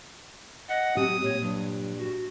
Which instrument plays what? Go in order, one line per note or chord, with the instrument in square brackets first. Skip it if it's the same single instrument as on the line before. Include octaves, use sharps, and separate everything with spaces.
[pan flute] D#5 [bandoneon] F#5
[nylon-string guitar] F#3 C#4 G4 [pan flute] C4 [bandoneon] D#6
[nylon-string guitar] A#2 [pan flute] C#5
[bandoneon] G2 [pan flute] F#3
[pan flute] F#4